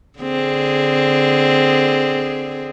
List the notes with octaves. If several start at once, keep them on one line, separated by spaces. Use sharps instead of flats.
D3 C4 G#4